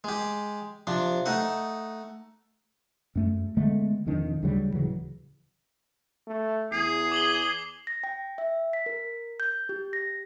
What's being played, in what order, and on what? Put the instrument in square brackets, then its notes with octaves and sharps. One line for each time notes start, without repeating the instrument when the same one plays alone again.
[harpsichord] G#3 G4
C3 F3 D4
A3 D#4 D#5 F#5
[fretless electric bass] F#2 A3
D3 G#3 A3 B3
E1 F2 D#3 D4
D2 C#3 F#3 G3
D1 C#3 E3 F#3
[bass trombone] A3
[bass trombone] E2 [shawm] G#4 [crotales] C7
[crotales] D6 F#7 G7
[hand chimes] A#6
G5
E5
B6
A#4
G6
G4
A#6